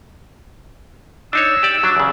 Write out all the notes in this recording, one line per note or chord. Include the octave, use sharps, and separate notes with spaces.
D4 D#4 C#5 E6
G4 D5
F#3 D4
E2 C#3